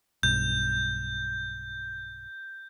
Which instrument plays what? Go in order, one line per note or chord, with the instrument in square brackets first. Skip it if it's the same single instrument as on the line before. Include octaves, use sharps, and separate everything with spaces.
[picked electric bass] B1 G2 [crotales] G6